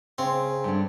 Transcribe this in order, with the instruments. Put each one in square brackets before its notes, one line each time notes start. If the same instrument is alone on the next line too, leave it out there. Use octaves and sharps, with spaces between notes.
[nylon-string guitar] C#3 [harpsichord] C4
[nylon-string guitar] G2 D3